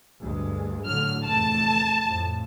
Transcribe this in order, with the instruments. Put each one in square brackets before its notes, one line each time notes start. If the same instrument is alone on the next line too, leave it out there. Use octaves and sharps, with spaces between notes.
[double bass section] D2 G2 G#3
[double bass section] A2 D3 F#3 [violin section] F6
[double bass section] F1 E2 A3 [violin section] A5
[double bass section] F2 A2